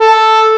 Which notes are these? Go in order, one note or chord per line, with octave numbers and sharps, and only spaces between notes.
A4